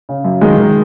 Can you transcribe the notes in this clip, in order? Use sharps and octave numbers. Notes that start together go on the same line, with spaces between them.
C#3
F#2
D#3 G#3
D#3